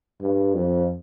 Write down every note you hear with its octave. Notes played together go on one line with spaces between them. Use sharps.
G2
F2